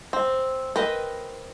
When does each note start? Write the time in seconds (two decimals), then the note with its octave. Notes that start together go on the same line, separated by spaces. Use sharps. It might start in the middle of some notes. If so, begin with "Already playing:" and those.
0.13 C4
0.76 C4 A#4 B4 D#5